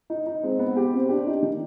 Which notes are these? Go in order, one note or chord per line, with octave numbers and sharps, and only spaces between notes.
D#4
D#4
G#3 C4
B3
G4
C4
D4 G4
D#4
D#3